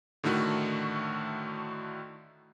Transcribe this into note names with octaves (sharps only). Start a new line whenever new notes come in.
A2 D3 D#3 A3 F#4